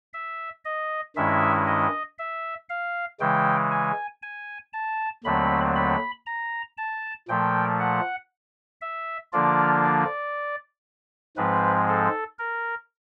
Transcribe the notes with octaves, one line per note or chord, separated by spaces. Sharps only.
E5
D#5
G2 D#3 G#3 C#4 E4 E5
D#5
E5
F5
C#3 E3 G#3 G5
G#5
G#5
A5
D#2 D3 F#3 A3 C4 B5
B5
A#5
A5
A#2 F3 A3 G5
F#5
E5
D3 F3 A#3 D4 F4 D5
D5
G#2 F3 G#3 C4 B4
A4
A#4